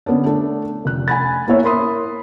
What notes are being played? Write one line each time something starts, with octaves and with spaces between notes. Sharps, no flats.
D3 B3 C#4 D4
A3 D4 A4
F1 F#6
G#5 B5 A6
A#3 B3 E4 C#5 E5
A#4 B5 C6 D#6